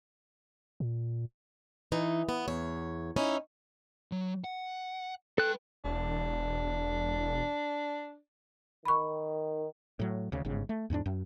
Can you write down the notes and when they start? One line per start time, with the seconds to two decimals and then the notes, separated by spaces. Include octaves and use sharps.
0.80 A#2
1.92 E3 D#4
2.29 B3
2.48 E2 C#5
3.16 C#4 D#4 E4
4.12 F#3
4.44 F#5
5.38 A4 B4 G5 F#6
5.84 E1 D4
8.85 D#3 B5 C#6
9.99 A2 F#3
10.32 D2 C#3
10.45 G1 G#2 C#3
10.69 A3
10.90 E2 G#2 G#3 D4
11.06 F#2